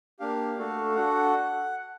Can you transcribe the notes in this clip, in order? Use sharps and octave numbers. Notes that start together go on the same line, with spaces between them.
A#3 D4 G4 F5
A3 D4 F#4 A4
D4 F#4 A4 F#5